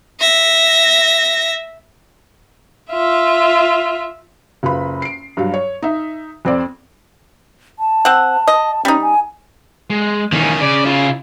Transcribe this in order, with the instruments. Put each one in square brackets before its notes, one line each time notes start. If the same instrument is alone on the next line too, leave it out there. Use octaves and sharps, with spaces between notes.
[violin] E5 A#6
[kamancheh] F4 E5
[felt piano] F#1 F4 B4 B5
C7 D7
G2 F#3 F5
C#5
D#4 E5
F2 C4 C5 D5
[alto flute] A5
[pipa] C4 F#5
D#5
[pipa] G3 D#4 [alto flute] C#4
[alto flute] G#5
[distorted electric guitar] G#3
[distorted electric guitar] D#2 E3 [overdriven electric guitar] D#3 C#4
[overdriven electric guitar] C#3 [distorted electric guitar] D5
[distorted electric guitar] E4 F4